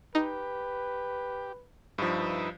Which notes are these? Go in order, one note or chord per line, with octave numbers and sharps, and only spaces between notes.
D#4 G4 B4
G2 F3 D#4 B4 E5